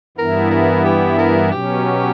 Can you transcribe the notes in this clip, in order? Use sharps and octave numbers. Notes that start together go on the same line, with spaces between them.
G2 E3 B3 E4 A#4
A#4
G4
A#4
B2 F#3 C#4 G4